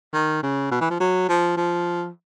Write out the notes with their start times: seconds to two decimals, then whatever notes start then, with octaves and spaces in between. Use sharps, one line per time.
0.13 D#3
0.43 C#3
0.71 B2
0.81 E3
0.90 F3
1.00 F#3
1.29 F3
1.57 F3